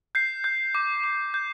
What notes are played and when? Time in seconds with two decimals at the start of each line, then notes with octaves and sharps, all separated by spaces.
0.15 G6 C7
0.44 G6
0.75 D6
1.04 D6
1.34 G6